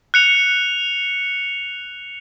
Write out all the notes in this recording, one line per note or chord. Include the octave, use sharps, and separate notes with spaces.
F#6 C#7 F7